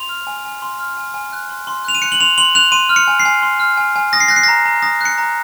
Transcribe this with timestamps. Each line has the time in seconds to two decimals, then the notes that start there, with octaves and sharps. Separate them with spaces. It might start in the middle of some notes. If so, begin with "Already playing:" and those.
Already playing: C6 F7
0.09 F6
0.27 G#5
0.45 G#5
0.62 C6
0.79 F6
0.97 G#5
1.14 G#5
1.33 F#6
1.50 C6
1.67 C6
1.85 F#6 F7
1.95 D#7
2.02 F#6 C#7
2.12 F#7
2.20 C6 F7
2.38 C6 F#7
2.55 F#6 F7
2.72 C6 D#7
2.89 F6
2.96 C#7
3.08 G#5
3.20 C7
3.26 G#5
3.43 C6
3.60 F6
3.77 G#5
3.96 G#5
4.13 D#6 A#6
4.20 C7
4.28 F#6 A#6
4.36 C7
4.43 A#5 A#6
4.66 A#5
4.83 D#6 A#6
5.01 F#6 C#7
5.18 A#5